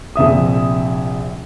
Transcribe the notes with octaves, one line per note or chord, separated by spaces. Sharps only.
A#1 C3 E5 D#6